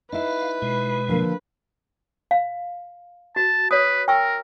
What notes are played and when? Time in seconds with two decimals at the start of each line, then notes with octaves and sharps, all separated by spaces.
0.12 D#4 E4 B4 F5
0.62 B2 G#3
1.08 D3 F3 A#3
2.31 F5
3.36 F#4 A5
3.71 B4 C#5 D#6
4.08 A#4 G5 C#6 E6